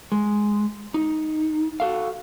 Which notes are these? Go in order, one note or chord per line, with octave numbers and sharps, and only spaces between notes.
G#3
D#4
F#4 A4 F5